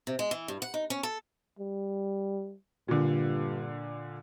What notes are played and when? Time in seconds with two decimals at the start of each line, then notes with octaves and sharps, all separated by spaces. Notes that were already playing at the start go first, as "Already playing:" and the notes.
0.07 C3
0.19 G#3
0.31 E3
0.48 G2
0.62 F#5
0.74 D#4
0.90 C#4
1.03 A4
1.59 G3
2.88 G2 A#2 D3